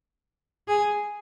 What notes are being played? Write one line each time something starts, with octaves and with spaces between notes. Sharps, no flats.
G#4